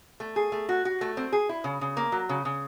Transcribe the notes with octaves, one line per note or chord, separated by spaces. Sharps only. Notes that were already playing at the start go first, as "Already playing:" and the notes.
A3
G#4
A3
F#4
F#4
A3
C4
G#4
E4
C#3
C#3
A#3
F#3
C#3
C#3